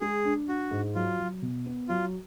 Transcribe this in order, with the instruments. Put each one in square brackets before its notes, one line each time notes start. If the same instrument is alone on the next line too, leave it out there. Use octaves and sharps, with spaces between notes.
[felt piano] G#3 [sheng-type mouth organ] G#4
[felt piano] D4
[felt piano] D4 [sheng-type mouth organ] F#4
[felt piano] G#2
[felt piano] F#3 [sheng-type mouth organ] F4
[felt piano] F#3
B2
B3
[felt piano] F#3 [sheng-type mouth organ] F4